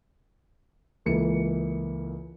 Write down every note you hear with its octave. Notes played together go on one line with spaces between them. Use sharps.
C#2 E3 A#3 A4 C#7